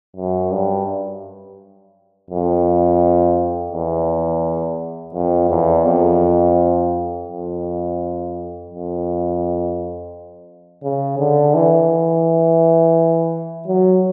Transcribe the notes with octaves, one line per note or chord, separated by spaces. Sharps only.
F#2
G2
F2
E2
F2
E2
F2
F2
F2
C#3
D3
E3
F#3